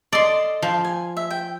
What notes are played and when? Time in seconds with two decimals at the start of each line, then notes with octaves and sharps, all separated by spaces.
0.12 A4 D5 D#5 C6
0.62 F3
0.85 G#5
1.17 E5
1.31 G5